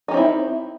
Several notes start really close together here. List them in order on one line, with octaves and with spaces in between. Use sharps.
D#4 C#4 C4 E4